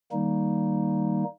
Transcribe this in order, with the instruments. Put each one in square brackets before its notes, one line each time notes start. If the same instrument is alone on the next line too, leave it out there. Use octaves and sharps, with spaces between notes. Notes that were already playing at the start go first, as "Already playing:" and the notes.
[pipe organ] D#3 G3 A#3 D#4